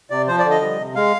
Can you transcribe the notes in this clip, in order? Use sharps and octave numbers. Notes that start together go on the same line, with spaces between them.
C3 D5
F3 C5
D5
D3
D#5
G3
C3
G#3 F5